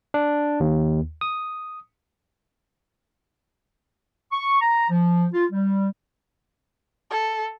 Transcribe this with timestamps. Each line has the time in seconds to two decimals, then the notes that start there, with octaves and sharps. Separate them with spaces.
0.14 D4
0.60 D#2
1.21 D#6
4.32 C#6
4.61 A#5
4.90 F3
5.33 F4
5.51 G3
7.11 A4